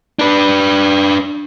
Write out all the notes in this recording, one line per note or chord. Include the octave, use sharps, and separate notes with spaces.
D4 B4